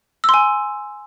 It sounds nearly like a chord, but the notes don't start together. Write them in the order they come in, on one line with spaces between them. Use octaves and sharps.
E6 C6 G#5